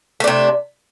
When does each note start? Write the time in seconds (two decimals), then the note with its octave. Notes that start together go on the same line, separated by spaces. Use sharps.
0.20 A3
0.24 D4
0.27 C3